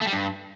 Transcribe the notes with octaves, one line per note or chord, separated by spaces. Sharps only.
A3
G3
G2